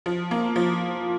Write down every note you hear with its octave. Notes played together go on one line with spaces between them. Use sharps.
F3
A#3
F3